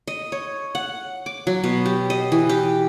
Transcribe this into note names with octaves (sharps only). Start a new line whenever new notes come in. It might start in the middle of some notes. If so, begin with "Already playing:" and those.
D#5
C#5
F#5
D6
F#3
B2
G4
D#5
E3
G4